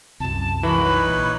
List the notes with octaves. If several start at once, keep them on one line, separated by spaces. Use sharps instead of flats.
C2 F#2 A5
E3 G#3 F#4 A#4 B5
D#4 B4 C#5
A#1